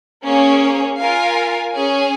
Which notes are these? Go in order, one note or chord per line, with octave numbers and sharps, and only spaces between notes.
A#3 C#4 G#4 C#5
F4 A#4 F5 G#5
C#4 G#4 C#5 G#5